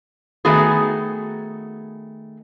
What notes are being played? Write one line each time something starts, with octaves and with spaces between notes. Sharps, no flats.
D#3 A3 B3 F#4 G#4